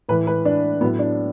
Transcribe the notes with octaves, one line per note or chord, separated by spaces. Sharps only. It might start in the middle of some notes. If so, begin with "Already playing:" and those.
A2 E3 B4
B4
D4
A2 F#3 B3
D4